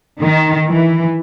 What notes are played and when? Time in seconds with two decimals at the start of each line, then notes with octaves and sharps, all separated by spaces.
0.20 D#3
0.70 E3